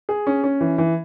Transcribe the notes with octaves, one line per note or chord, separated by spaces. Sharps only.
G#4
C#4
C#4
E3
E3